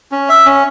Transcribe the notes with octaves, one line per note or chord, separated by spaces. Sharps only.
C#4
E5
C#4